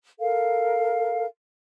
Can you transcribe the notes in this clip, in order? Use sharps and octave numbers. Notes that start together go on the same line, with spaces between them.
A4 A#4 F5